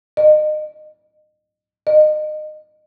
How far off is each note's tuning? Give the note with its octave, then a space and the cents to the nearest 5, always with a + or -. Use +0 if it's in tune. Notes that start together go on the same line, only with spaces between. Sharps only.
D#5 -30
D#5 -25